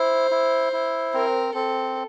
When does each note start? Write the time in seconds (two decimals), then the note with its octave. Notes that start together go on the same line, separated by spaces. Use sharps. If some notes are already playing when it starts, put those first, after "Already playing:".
Already playing: E4 C5
0.31 E4
0.73 E4
1.13 C4 A#4
1.55 C4 A4